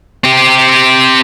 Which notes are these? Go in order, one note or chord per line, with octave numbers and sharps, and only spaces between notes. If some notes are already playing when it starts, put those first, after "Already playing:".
C4 G4